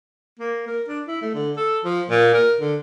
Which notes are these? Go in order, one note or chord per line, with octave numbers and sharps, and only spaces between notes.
A#3
A#4
D4
E4
A3
D3
A4
F3
A#2
A#4
D3